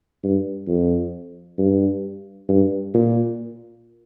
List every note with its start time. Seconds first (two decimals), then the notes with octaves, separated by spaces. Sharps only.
0.23 G2
0.67 F2
1.58 G2
2.48 G2
2.94 A#2